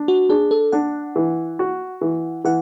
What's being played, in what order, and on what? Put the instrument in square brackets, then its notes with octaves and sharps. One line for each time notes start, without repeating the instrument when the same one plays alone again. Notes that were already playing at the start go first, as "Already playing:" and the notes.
Already playing: [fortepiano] D4
[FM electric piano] F#4
[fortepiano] D4 [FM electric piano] G#4
[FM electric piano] A4
[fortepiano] D4 [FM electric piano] F#5
[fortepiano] E3
F#4
E3
[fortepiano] E3 [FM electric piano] F#5